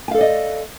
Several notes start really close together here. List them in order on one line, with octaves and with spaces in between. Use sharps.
G#5 F5 A4 D5 D#5